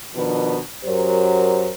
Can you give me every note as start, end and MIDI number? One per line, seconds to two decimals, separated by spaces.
0.15 0.57 47
0.15 0.57 51
0.15 0.57 53
0.15 0.57 62
0.15 0.57 71
0.85 1.69 42
0.85 1.69 54
0.85 1.69 67
0.85 1.69 70
0.85 1.69 72